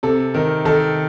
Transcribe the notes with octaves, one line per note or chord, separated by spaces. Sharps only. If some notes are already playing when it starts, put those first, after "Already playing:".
C3 A4
D#3 A#4
D#3 A4